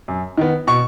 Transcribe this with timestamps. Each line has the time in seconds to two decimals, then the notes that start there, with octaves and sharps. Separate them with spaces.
0.08 F#2
0.38 D#3 B3
0.67 B2 C#6